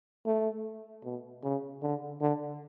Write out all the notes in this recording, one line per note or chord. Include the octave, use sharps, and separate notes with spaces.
A3
B2
C#3
D3
D3